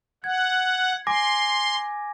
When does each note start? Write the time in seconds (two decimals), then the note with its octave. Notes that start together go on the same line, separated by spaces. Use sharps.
0.24 F#5 G#6
1.07 G#5 C6 D6 A#6